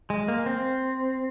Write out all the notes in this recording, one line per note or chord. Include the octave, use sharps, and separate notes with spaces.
G#3
A#3
C4